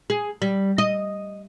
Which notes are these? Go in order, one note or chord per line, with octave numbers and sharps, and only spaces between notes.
G#4
G3
D#5